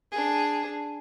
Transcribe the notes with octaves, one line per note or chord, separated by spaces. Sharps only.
D4 G#4